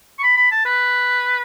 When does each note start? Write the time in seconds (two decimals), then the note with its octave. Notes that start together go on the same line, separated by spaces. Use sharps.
0.19 C#6
0.23 B5
0.37 B5
0.51 A5
0.65 B4